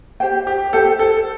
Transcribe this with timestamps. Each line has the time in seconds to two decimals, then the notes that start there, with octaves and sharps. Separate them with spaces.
0.20 G4 C5 G5
0.47 G4
0.73 G4 A4 C5 G5
0.99 A4